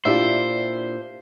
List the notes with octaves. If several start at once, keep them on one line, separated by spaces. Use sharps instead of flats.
A#2 D4 E4 F4 G4 C5 E5